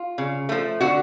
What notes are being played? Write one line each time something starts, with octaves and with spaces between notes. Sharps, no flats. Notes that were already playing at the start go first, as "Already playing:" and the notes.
Already playing: F4
C#3
F3 A3
D3 F#4